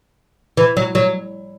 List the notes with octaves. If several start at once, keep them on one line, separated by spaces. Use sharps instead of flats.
E3
F#3
F#3